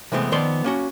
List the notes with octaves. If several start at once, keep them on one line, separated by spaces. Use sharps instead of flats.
C3 E3 G#3 A3 B3 C4
D#3 F3 B3 D5 C6
A#3 C#4 F#4